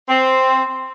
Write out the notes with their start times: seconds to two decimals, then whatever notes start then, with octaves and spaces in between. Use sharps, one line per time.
0.09 C4